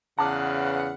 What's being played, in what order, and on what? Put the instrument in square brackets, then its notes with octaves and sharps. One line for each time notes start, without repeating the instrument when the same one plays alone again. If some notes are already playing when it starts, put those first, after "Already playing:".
[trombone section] E2 C#3 [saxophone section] B4 F5 F#5 [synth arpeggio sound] A5 A#5 D6